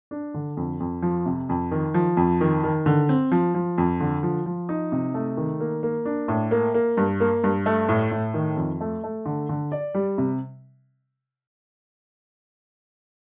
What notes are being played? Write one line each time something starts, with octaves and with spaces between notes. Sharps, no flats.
D4
D3
F2
F2
F3
C3
F2
D#3
F3
F2
D#3
D#3
D3
C4
F3
F3
F2
D3
F3
F3
D#4
C3
A3
D#3
A#3
A#3
D4
A2
A#3
A#3
G2
A#3
G2
A3
A2
A2
D#3
F2
A3
A3
D3
D3
D5
G3
C3